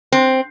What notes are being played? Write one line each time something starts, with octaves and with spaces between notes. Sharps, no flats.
C4